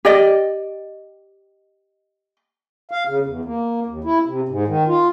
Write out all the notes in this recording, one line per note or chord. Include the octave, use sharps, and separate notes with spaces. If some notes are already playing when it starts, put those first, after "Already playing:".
G4 D5 D#5
F5
C#3
E2
A#3
D#2
E4
C3
G#2
D#3
F4